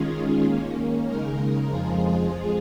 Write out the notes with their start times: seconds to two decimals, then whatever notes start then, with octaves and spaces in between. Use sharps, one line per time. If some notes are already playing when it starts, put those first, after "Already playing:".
Already playing: D#3 G#3 C#4 F4 G#4
0.43 D#3 A#3 C#4
1.06 C#3 G#3 D#4 A#4
1.68 F2 F3 G#3 F4 G#4